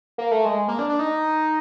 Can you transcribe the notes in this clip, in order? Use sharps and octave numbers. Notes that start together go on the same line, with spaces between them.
A#3
A3
G#3
A#3
D4
D4
D#4